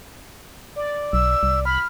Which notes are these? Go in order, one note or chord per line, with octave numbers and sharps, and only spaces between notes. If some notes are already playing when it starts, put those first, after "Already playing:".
D5
B1 E6
C2
B5 F6